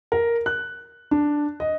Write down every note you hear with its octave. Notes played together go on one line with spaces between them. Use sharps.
A#4
F#6
D4
D#5